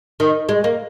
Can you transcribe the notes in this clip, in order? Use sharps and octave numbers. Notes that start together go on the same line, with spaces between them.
D#3
G#3
A#3